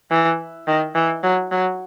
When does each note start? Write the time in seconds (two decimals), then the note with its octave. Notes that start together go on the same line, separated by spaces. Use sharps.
0.10 E3
0.67 D#3
0.95 E3
1.23 F#3
1.51 F#3